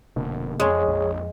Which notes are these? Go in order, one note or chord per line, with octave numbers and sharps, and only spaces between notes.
F1 B2 D3 A#3
F2 G#3 G#4 C#5
A#1 F2